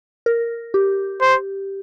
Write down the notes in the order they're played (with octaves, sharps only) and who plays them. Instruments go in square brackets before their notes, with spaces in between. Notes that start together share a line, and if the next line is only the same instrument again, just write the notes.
[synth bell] A#4
G4
[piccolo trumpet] C5